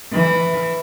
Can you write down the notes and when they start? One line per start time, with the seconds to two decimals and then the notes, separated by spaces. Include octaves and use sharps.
0.11 E3